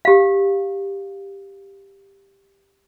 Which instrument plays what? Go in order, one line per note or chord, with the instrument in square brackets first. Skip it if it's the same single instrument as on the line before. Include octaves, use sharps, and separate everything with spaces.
[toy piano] G4 F5